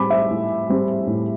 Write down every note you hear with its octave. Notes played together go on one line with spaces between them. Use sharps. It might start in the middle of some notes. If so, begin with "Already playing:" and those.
Already playing: A2 G3 C4 B5 D6
C5 E5
A2
G3 C4
A2